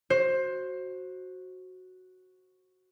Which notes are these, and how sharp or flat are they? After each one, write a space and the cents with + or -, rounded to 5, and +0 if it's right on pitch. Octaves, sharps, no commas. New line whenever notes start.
F#4 +0 C5 +15